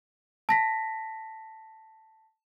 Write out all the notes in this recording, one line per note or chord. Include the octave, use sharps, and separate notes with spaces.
A5 A#6 B6